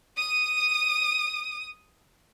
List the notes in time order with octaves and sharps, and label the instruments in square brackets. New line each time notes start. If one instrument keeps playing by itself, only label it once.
[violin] D#6 D#7